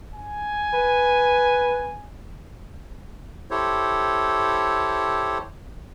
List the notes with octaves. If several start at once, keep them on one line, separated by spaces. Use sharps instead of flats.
G#5
B4
E4 G4 A4 C5 C#5